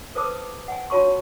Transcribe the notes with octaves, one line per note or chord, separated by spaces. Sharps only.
A4 B4 C5 A5 D6 D#6
F#5 G#5
F4 F#4 C#5 A5 C6 C#6